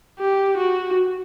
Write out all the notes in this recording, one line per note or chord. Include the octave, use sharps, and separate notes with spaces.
G4
F#4